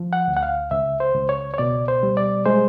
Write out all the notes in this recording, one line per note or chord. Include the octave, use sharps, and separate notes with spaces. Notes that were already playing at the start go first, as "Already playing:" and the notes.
Already playing: F3
F#5
D2
F#5
F5
C#2 E5
C5
C#2
C#5
C#5
B2 D5
C5
G3
D5
G#3 C5